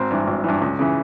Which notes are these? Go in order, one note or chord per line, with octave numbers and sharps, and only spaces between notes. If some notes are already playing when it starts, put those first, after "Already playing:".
Already playing: G#1 C4
G2 E3
G#1
G2 E3
C#2
C#3 E3